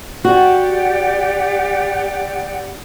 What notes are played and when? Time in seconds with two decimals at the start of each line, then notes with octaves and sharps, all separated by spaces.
0.25 F#4 G4 D5 F#5